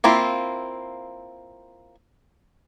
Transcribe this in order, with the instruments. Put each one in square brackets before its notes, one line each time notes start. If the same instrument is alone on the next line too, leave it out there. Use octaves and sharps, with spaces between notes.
[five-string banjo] A#3 C4 E4 F4